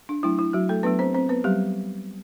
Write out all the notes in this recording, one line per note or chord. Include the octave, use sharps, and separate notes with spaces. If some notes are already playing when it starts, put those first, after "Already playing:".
D4
F#3 A3 D4 E4
E4
F#3 F#4
A3 A4
F#3 A3 B3 D4 B4
C4 C5
C4 C5
B3 B4
F#3 G3 G4